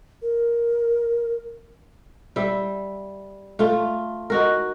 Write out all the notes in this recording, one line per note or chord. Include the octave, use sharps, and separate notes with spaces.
A#4
G3 E5
A3 F4
D#4 F#4 A#4